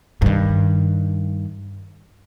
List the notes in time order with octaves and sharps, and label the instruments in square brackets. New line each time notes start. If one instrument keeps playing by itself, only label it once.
[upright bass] G2 D#3